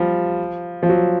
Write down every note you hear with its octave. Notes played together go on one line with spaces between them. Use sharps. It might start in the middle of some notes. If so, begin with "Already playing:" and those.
Already playing: F3 G3
F3
F#3